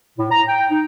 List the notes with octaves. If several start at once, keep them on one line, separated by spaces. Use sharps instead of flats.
A2
A#5
G5
D#4